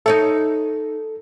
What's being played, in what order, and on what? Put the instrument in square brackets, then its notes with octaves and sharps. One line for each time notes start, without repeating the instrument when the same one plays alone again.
[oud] D#4 C#5 E5 [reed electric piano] A4